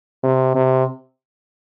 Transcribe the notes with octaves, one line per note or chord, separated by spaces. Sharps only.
C3
C3